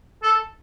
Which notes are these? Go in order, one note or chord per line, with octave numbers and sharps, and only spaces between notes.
A4